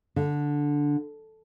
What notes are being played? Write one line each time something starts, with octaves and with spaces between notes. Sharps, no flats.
D3